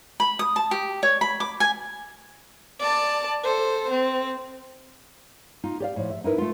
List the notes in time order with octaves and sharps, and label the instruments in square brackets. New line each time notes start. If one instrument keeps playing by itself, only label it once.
[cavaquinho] B5
D#6
A5
G4
C#5
B5
D6
G#5
[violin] D5 A5
A4 C5
C4
[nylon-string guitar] D#4 F4
G4 D5 F5
A2 F3
E5
D#4 E4 A#4 B4
A3 F4